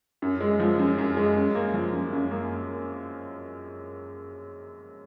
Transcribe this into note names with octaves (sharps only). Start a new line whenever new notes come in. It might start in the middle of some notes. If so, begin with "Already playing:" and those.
F#2
G#3
F3
F#2
F#2
G#3
F#2
A#3
F3
F#2
F#2
A#3